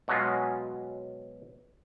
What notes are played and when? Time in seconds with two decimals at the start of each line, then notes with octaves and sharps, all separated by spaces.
0.08 B2 F#3 G#3 C#4 F4